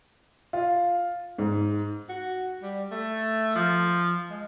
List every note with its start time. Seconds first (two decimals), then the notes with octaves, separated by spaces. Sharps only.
0.53 F4
1.38 G#2
2.09 F#4
2.62 G3
2.91 A3
3.55 F3
4.30 G#3